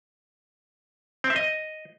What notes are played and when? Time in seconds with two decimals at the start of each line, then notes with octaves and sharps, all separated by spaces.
1.24 C4
1.30 E5
1.36 D#5